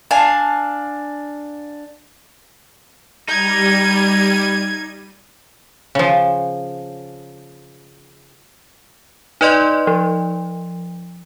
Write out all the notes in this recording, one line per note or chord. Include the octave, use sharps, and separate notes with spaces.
D4 F5 G#5 A5
G3 D#4 G#6 D#7
C#3 F3
D#4 B4 D5 D#5 C6
F3